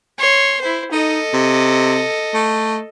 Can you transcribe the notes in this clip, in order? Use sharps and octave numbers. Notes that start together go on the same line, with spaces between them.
C#5 C6
E4 C5
D#4 A4 D#5
C3
A3